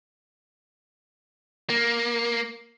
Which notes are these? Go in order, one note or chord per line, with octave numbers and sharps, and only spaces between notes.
A#3